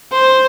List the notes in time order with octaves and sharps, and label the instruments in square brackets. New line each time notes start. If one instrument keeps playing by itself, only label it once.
[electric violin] C5